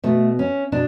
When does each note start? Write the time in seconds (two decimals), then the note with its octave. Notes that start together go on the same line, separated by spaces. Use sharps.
0.04 B2 A3
0.39 C#4
0.72 B2 D4